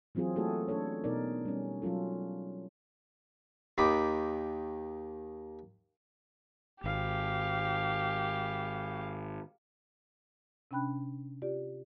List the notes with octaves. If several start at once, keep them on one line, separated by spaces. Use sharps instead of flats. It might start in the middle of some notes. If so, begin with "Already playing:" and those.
E3 F#3 C4 F4 G#4
A3 A#3 E4 F#4 G#4 A4
C#4 D4 A4 C#5
B2 D#4 G#4 A#4 D5
G3 C#4
F#3 C#4 F4 A4
D#2 D#3 B5 D6
G#1 G4 F5
C3 C#4 D4 G5 B5 F#6
F4 G4 D5